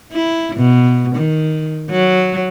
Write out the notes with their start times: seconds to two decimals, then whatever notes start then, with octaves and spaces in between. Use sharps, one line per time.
0.12 E4
0.56 B2
1.16 D#3
1.90 F#3